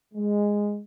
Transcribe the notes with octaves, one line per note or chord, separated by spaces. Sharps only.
G#3